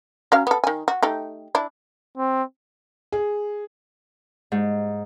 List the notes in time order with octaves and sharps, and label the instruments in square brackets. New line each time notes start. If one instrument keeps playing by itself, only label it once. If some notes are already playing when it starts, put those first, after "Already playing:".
[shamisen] F#3 C#4 F5
B3 A4
D#3 G#5
F#4
A3 D#4 G4
D4 E4
[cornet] C4
[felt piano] G#4
[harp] G#2